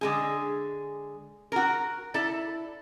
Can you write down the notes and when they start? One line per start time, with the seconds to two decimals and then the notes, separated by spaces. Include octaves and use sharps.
0.01 D3 G#3 G#4
1.52 F#4 A#4
2.14 E4 A4 D5